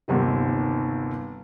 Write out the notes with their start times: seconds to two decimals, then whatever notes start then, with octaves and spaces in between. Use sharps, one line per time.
0.08 G1 D#2 C3 D#3